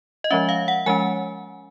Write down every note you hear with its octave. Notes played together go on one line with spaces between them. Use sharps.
D#5
F3 G#3 C#4 E5
F5
F#5
F3 G#3 C#4 G#5